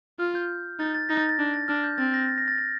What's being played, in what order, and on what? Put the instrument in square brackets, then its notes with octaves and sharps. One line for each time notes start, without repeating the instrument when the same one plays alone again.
[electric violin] F4 [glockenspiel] F6
[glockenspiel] G6
[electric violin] D#4 [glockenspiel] A6
[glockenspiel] A6
[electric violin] D#4 [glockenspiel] A#6
[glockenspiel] A6
A6
[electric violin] D4
[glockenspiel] A6
[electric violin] D4 [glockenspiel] F6
[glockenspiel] G6
[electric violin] C4 [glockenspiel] A6
[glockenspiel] A#6
A6
A#6
A6
A6